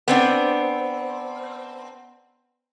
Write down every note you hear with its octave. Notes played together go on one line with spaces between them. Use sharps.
B3 C4 D4